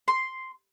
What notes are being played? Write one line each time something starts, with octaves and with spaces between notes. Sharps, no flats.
C6